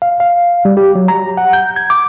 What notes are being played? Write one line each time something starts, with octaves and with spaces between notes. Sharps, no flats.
F5
F5
G3
G4
F#3
A#5
F#5
G6
G#6
D6